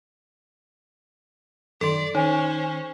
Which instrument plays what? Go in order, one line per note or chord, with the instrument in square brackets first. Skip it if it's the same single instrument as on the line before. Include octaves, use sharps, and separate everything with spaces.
[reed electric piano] F#2 D#3 C6 [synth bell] A4 D7 [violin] D5
[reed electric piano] D#3 [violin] C#4 C5 [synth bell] D#4 [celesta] C#5 G#5